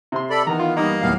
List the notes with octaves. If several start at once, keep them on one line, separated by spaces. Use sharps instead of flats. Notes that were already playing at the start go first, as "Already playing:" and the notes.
C3 C6
A4 D5 B5
D#3 E3 B3 A#5
F4
G2 A#3 D#4
D#2 A2 E3 F#3 B3 F5